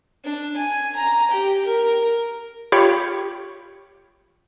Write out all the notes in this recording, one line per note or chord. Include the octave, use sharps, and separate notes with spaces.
D4
G#5
A#5
G4
A#4
F4 G4 C#5 B5